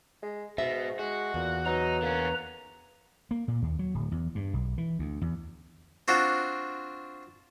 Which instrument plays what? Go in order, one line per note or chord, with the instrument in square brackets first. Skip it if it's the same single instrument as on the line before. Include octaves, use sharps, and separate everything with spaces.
[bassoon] G#3
[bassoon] G#2 [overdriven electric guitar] B2 [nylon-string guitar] E5
[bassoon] G#3 [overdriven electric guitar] F#4
[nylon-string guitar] E2 [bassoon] A#2
[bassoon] F#3 [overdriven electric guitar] D#4 [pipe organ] B4 A#5
[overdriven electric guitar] D3 C#4 [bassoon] A#3
[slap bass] A#3
A#2
D#2
F#3
D1
E2
G2
B1
E3
D2
E2
[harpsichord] C4 D4 F4 F#4